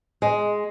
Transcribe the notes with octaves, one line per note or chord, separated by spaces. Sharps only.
G#3